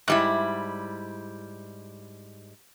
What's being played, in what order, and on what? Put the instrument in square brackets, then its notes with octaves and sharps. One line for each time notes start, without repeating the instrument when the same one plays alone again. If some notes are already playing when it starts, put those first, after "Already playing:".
[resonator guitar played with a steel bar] G#2 G3 E4